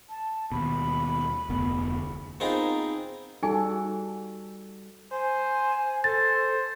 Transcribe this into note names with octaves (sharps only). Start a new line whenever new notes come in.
A5
D#2 B2 B5
F1 D2 B3
B3 C4 D#4 F4 G#4 A#4
G3 D#4 F#4 G#4 A4 G#5
C5 G#5
A4 C5 A6